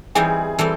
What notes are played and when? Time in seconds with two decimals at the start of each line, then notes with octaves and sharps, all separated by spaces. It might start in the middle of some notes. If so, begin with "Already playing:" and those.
0.15 E3 G3 C4 D#4 G#4
0.58 E3 G3 C4 A4